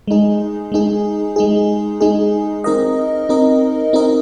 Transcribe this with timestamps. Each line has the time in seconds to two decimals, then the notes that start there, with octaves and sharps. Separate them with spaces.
0.08 G#3 D#4 G#4
0.72 G#3 D#4 G#4
1.36 G#3 D#4 G#4
2.01 G#3 D#4 G#4
2.64 C4 D#4 A#4 D#5
3.29 C4 D#4 A#4 D#5
3.93 C4 D#4 A#4 D#5